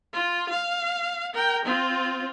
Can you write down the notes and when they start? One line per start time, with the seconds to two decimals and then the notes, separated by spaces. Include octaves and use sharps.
0.13 F4
0.49 F5
1.34 A#4 G5
1.65 C4 F4